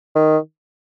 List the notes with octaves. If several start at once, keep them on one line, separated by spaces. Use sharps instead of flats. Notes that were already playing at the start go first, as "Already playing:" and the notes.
D#3